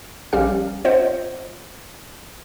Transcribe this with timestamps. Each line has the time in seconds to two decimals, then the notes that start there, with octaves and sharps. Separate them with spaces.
0.33 A#1 G3 C#4 G4 F5 F6
0.85 C4 F4 C5 C#5 D#5 F#5